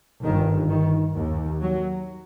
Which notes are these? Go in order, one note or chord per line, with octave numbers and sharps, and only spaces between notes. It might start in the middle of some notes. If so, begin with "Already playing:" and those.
G1 G2 D#3
D#3
D#2
F#3